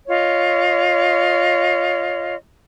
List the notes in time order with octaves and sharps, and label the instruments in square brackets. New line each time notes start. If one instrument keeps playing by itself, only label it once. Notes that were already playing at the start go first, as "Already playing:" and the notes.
[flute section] F4 C#5 D#5